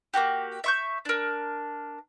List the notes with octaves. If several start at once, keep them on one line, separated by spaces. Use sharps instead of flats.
A#3 B3 F#4 G4
E5 C#6 G6
D4 A#4